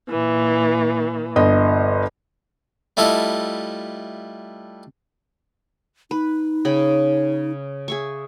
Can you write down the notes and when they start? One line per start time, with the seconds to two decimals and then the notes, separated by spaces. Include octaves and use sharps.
0.10 A#2 E3
1.36 G1 D#5
2.97 G3 A3 E4 F4 A4 D#5
6.11 D#4 B4
6.65 C#3 G5 B5
7.88 G#4 E5 C#6